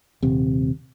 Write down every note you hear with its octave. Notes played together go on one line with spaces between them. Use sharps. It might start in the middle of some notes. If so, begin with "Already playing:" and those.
D#1 C3